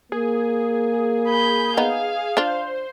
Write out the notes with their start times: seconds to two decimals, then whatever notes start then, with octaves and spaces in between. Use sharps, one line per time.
0.12 A#3 G#4
1.27 B5 G6
1.77 B3 D#4 F5
2.37 D4 F4 C5